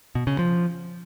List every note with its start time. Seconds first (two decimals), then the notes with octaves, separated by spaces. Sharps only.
0.15 B2
0.27 C#3
0.39 F3